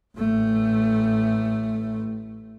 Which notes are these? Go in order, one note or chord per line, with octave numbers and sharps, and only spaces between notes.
A1 A3